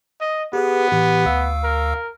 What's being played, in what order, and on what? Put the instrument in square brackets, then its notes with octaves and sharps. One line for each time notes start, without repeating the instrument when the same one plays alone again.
[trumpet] D#5
[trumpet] B3 [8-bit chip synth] G4 G#4 B4
[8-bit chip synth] A2 E3 G4
D2 F5 E6
[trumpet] A#4